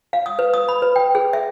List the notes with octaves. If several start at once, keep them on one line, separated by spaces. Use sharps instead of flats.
F5
D#6
B4
D#6
B5
B4
G5
G#4
E5